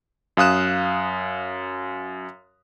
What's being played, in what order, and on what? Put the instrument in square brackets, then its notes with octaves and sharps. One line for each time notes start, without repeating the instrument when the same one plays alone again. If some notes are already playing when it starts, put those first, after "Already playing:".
[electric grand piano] F#2 F5 D#6 F#6 E7